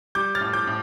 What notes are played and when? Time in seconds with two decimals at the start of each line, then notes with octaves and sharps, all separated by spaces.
0.15 G3 D6 G6
0.35 F6 A6
0.41 A2
0.53 D6 G6
0.67 A2